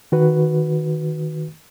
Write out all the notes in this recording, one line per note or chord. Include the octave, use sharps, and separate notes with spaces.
D#3 F#4 B4